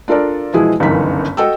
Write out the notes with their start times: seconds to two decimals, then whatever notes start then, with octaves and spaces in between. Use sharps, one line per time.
0.08 D4 F4 A4 A#4 D5
0.53 B2 E3 F3 G#3 E4 G#4
0.80 G1 C#2 F#2 D#3 E3 B6
1.37 F#4 A4 D#5 G5 A5 E6